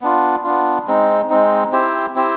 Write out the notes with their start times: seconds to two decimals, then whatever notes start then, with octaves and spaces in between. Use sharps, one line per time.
0.01 B3 D4 F4
0.44 B3 D4 F4
0.87 G#3 C4 D#4
1.30 G#3 C4 D#4
1.72 C4 E4 G4 C5
2.15 C4 E4 G4 C5